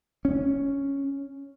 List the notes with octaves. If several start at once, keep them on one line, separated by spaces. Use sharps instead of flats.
C#4